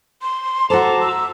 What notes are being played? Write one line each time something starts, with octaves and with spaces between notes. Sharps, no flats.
C6
F#4 A4 C5 A5 A#5 D6
E6